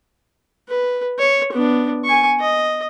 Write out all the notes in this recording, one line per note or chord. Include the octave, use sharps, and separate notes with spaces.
B4
C#5
B3 D4
G#5 C#6
D#5